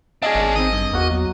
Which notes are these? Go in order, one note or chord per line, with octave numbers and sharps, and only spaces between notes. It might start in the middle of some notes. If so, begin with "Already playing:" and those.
C#4 D4 G#4 D#5
G#1
D#3 C4 D#5
G2
E2 A#3 F#4
F#3